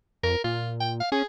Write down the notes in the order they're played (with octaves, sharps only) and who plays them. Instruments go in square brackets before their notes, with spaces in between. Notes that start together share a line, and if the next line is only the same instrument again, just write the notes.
[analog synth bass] F2 [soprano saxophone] A#4
[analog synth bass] A#2 [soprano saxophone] F4
[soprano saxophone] G5
F5
[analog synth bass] C#4 [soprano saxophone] G#4